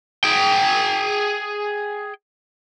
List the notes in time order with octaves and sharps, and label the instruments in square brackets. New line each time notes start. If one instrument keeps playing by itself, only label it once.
[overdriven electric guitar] G#4 G5